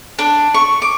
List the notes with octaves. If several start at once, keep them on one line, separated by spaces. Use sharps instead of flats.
D4
C#6
D6